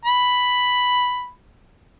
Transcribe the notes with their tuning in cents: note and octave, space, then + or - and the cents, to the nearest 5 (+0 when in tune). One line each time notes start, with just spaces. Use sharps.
B5 +0